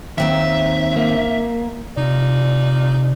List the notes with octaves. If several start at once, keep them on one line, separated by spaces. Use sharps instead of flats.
D#2 D#3 C4 D#4 E5
A#3
C3 D#4 F4 D5